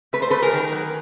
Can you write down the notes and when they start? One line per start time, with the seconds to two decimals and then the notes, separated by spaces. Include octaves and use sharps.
0.13 A3 B4
0.22 C5
0.30 A3 A4 B4
0.42 G#4 A#4
0.53 D#3
0.72 F#3